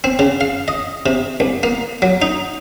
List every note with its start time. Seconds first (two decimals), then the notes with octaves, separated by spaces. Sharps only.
0.04 C4
0.19 C#3
0.41 F5
0.68 D#5
1.06 C3
1.40 C2
1.63 A#3
2.02 F#3
2.22 D#4